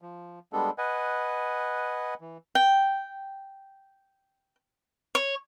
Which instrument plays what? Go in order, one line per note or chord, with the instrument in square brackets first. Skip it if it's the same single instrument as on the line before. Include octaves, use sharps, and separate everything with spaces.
[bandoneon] F3
G3 G#3 B3 D4 A4
B4 D#5 F#5 G#5
E3
[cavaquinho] G5
C#5